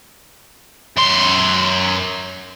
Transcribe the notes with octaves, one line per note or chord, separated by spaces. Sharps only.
F#2 C6